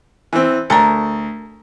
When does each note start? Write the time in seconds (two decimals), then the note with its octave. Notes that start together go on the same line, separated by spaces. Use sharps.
0.33 E3 C4
0.70 D2 A4 A#4